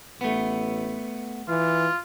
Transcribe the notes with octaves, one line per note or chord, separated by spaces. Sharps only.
A1 A3 B3
E3 F4